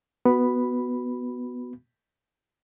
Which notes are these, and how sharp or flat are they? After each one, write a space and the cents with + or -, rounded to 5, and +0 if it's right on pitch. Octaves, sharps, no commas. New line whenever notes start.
B3 +0 F#4 +0 B5 +0